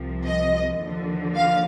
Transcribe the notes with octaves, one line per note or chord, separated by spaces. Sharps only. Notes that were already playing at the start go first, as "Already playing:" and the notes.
Already playing: C2 C3 F3
D#5
D#2 D3 F3
F5